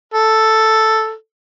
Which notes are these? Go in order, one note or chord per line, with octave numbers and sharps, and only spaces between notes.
A4